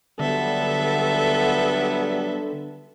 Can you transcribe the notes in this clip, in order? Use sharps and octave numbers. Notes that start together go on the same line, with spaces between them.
D3 F#3 G3 B3 A4 E5